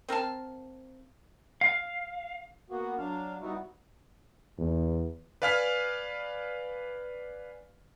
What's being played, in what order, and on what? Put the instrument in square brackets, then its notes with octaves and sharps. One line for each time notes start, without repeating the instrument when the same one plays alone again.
[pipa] C4 A#4 F5 A5
[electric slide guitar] F5
[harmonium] A#3 B3 F#4
F#3 D4 F5
G3 B3 D#4 E4 F#4
[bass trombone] E2
[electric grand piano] B4 D5 F5 G#5 F6 B6